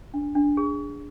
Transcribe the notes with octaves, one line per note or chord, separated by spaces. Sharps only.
D4
D4
G#4